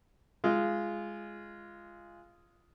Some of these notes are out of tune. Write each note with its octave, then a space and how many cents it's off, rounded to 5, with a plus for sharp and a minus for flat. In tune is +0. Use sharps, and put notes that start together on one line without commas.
G#3 +0 F4 -15